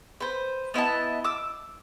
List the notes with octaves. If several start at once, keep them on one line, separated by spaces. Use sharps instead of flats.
B4 C5
B3 E4 D#5 A5
D6 E6